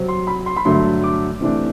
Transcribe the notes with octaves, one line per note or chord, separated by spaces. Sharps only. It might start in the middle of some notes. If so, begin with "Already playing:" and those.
Already playing: C3 F#3 C4
C6
B5
C6
B5
G2 D3 F#3 A3 C6
D6
C3 E3 A3 D4